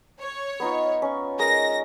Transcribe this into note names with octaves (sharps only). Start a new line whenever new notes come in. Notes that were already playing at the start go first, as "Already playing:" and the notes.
C#5
B3 D#4 F4
C#4 C#6
G#3 A#4 D#6 A#6